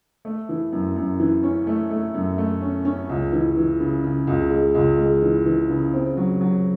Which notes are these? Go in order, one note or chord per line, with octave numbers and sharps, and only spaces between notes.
A3
E3
F#2
F#2
E3
C#4
A3
A3
F#2
A3
C#4
C#4
C#2
E3
E3
C#3
C#3
C#2
G#3
C#2
G#3
E3
E3
C#3
C4
F#3
F#3